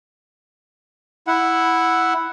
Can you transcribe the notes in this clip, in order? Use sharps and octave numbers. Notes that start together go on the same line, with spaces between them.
E4 F#5